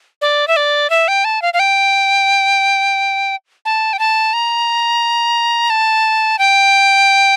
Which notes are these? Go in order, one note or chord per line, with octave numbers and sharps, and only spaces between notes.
D5
E5
D5
E5
G5
A5
F5
F5
G5
A5
G5
A5
A#5
A5
G5